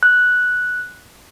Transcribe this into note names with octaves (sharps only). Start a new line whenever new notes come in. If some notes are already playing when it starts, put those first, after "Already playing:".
F#6